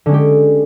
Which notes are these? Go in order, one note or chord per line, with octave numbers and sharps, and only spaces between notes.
D3 G#3 C#4 G4